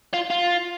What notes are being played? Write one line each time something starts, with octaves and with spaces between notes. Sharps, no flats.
F4
F4